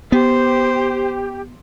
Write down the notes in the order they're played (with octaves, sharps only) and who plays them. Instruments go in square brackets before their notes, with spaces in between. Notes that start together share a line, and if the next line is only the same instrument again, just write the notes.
[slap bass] B3 [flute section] G4 [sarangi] C5